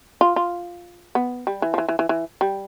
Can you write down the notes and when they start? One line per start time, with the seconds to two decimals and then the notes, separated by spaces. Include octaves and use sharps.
0.21 F4
0.36 F4
1.15 B3
1.47 G3
1.62 E3
1.74 F3
1.78 E3
1.88 E3
1.99 E3
2.09 E3
2.41 G3